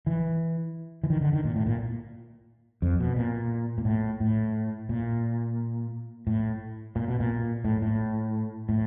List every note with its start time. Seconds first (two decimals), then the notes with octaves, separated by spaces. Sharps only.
0.07 E3
1.03 E3
1.10 D#3
1.21 D3
1.33 D#3
1.45 A#2
1.56 A2
1.66 A#2
2.82 F2
3.00 B2
3.16 A#2
3.78 A#2
3.85 A2
4.20 A2
4.89 A#2
6.27 A2
6.96 A#2
7.08 B2
7.20 A#2
7.65 A2
7.82 A2
8.69 A2